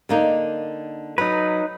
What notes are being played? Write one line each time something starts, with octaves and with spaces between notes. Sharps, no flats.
D3 A#3 D#4
F#3 D#4 B4